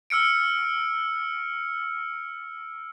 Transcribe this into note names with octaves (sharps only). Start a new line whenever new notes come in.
E6 F6 C#7 D7